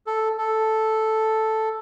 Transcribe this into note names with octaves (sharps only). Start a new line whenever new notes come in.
A4
A4